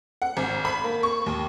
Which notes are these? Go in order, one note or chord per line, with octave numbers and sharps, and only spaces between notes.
F#5
G#1
B5
A#3
C#6
D#2